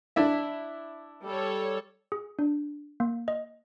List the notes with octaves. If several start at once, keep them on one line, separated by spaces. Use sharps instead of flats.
D4 E4 E5
G3 A4 C#5
G#4
D4
A#3
D#5